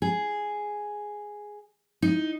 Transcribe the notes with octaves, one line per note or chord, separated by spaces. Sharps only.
G#4
D#4